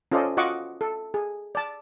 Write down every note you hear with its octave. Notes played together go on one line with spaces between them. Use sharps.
C#4 F4 A4 C5 D5 D#5
F4 F#4 D#5 F#5 C#6 D6
A4
G#4
D5 A5